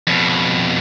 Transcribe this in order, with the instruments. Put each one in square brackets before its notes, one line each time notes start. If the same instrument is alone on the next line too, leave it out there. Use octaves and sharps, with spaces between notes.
[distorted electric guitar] F2 B2